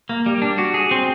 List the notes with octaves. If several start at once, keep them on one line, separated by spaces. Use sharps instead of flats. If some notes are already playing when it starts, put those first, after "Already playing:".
A#3
G3
D4
F#4
G#4
C4